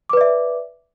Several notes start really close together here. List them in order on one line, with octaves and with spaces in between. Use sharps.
D6 B4 D5 E5